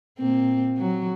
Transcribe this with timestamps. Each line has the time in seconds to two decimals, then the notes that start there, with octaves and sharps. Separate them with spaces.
0.19 A#2 C4
0.78 F#3